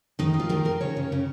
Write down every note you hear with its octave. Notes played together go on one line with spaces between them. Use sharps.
D#3 D#4
D#3
F4
D#3 A#4
D#3 A#4
C#3 C#5
C#3
C#3